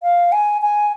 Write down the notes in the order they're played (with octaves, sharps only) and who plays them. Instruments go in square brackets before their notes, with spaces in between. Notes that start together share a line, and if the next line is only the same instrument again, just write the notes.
[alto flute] F5
G#5
G#5